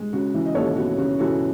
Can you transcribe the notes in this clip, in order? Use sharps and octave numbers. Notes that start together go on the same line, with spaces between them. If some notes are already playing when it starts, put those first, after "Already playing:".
Already playing: G#3
C#3 F#4
E3
D#5
D#2 A4 C#5
B3 F#4
C#3 F#4
E3 F#4 A4